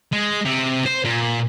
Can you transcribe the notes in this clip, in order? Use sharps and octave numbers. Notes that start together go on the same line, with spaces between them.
G#3
C3
C5
A#2